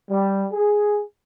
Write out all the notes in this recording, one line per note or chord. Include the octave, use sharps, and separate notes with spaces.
G3
G#4